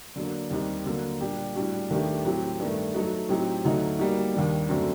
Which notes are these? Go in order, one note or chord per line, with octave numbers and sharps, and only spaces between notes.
D3 F#3 A#3 D4
D#2 D#3 G3 C4 D#4
D3 F#3 A#3
A#2 G3 D4 G4
A2 G3 D4 F#4
D#2 D#3 A3 D4 G4
A2 F#3 C4 G4
G2 D#3 A3
F#3 A3 D#4 F#4
A2 F#3 C4 D#4 G4
D2 D3 F#3 A3 D#4
G3 A#3 D#4 F#4
D#2 D#3 G3 D4
F#2 D3 A3 C4 F#4